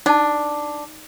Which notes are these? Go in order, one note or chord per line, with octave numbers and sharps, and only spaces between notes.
D4 D#4 A5